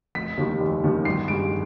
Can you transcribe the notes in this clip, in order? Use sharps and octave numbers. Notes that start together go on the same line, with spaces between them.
F1 B6
D#2 D#3 G3
F1
D#2 D#3 G3
G1 C7
G2 D#3 G#3 D7